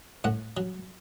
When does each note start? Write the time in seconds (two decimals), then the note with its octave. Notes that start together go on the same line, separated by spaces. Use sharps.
0.24 A2 F#5
0.57 F#3